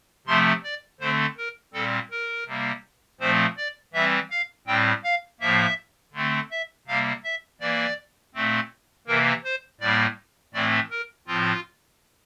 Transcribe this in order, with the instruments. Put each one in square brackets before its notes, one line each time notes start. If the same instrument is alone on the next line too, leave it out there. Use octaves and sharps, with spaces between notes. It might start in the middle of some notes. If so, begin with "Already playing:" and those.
[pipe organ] C3 F3 A3 C4 C6
D5
D3 A3 C4 C5
A#4
A#2 G3 C4 A4
A#4
C3 G3 A#3
A#2 F3 A3 C4 C5
D5
E3 G3 C4 E5
F5
A2 G3 C4 G5
F5
A2 F3 A#3 E5
D3 A3 C4
E5
C3 G3 A#3 F5
E5
E3 A#3 D5
A#2 A3 C4
C3 E3 A#3 A#4
C5
A2 G3 A#3 D5
A2 E3 A3 C4 D5
A#4
A2 F3 C4 F4